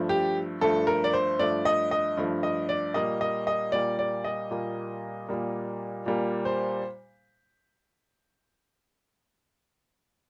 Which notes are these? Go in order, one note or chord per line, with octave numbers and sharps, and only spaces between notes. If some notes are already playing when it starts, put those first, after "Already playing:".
Already playing: G2 F3 A3
G4
G2 F3 A3 A4
A#4
D5
C5
G2 F3 A3 D5
D#5
D#5
G2 F3 A3
D#5
D5
A#2 G3 A#3 D#5
D#5
D#5
A#2 G3 A#3 D5
D5
D#5
A#2 G3 A#3
A#2 G3 A#3
A#2 G3 A#3
C5